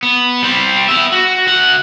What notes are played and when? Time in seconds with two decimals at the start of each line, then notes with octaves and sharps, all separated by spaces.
0.03 B3
0.43 G3 C4
0.89 B3 E5
1.12 F#4
1.47 D2 F#5